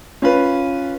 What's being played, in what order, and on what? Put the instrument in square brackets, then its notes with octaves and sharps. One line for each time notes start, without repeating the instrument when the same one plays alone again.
[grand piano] C#4 F4 B4